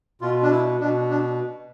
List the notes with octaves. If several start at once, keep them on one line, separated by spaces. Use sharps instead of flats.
B2 F4
D4
E4
B2 D4
D4